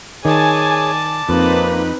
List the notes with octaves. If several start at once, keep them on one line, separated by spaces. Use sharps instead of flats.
D#3 G#4 C#5 D5 G#5 A5
F2 A#3 C4 D#4 B4